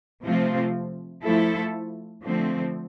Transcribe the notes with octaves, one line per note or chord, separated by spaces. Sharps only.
C3 F3 A3 C4 F4
F3 A3 E4 A4
D3 F3 A3 C4